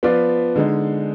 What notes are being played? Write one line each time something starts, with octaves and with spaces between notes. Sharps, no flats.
F3 B3 F4 B4 D5
D3 G#3 D#4